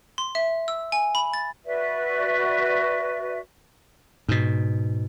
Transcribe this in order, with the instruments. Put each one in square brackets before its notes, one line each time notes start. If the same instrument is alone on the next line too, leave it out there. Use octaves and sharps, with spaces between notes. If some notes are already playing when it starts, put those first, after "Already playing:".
[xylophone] C6
E5
E6
G#5
B5
A6
[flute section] F#4 B4 D5 E5
[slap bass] G#2 B2